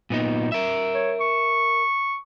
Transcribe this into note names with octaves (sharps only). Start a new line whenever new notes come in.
A#2 B3 D#4
A#4 E5
C#5
C#6